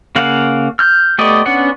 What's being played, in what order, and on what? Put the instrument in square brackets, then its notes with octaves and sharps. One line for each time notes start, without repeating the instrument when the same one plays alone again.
[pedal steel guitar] C#3 A#3 F5 F#5
F6 G6
A3 B3 G4 D5 D#5
B3 C#4 D4 F#5